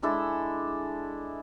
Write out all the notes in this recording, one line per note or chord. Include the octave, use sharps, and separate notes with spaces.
G#3 D4 E4 A4